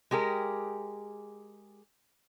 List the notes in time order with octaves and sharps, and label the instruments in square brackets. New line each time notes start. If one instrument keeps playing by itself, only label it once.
[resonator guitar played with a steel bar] G#3 G4 G#4 A#4